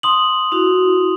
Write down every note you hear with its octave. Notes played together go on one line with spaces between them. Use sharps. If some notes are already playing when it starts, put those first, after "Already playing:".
C6 D#6 F#7
E4 F#4 F7